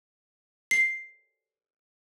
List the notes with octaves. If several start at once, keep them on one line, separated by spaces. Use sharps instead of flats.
C7